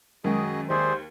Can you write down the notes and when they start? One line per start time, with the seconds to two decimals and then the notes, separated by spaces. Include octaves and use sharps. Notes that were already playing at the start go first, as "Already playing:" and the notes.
0.24 F#2 D#3 G#3 F#4 G#4 D#5 G5
0.70 D#2 G#4 C5 D5 E5